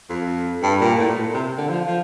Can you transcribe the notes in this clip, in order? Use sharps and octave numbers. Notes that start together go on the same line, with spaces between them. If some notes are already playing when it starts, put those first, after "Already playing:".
F2
G2
A#2
A2
A#2
C3
D3
F3
F3